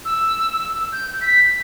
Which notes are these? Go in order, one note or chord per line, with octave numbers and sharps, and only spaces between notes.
E6
G6
B6